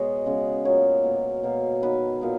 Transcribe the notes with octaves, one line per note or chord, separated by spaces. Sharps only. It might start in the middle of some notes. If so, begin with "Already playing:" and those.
Already playing: B2 G#3 B3 C#5 D#5
C#3 G#3 B3
A#2 F#3 B3 C#5
B2 A#3
B2 A#3
D#3 F#3 B3 B4
A#2 F#3 B3